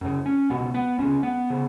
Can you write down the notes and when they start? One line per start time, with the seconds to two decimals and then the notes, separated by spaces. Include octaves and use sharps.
0.01 F#2 C#3
0.26 C#4
0.50 C#2 B2 B3
0.74 B3
0.98 C#2 C#3 C#4
1.23 B3
1.50 C#3